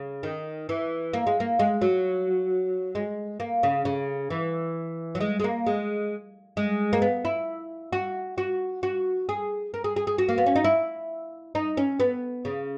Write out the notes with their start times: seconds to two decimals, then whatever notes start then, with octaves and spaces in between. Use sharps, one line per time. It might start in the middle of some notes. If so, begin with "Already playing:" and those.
Already playing: C#3
0.23 D#3
0.69 E3
1.13 A#3
1.27 G#3
1.40 A#3
1.59 G#3
1.82 F#3
2.95 G#3
3.40 A#3
3.63 C#3
3.85 C#3
4.30 E3
5.15 F#3
5.20 G#3
5.40 G#3
5.44 A#3
5.66 G#3
6.57 G#3
6.93 A#3
7.02 B3
7.25 E4
7.93 F#4
8.38 F#4
8.83 F#4
9.29 G#4
9.74 A#4
9.84 G#4
9.96 G#4
10.07 G#4
10.18 F#4
10.29 A#3
10.38 B3
10.46 C#4
10.56 D#4
10.64 E4
11.55 D#4
11.77 C#4
12.00 B3
12.45 C#3